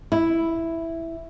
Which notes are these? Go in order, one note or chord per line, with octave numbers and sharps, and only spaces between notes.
E4